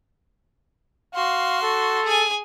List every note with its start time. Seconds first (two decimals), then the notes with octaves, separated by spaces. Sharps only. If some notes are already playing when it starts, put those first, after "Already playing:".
1.14 F#4 F5 C6
1.62 A4
2.05 G#4 G#5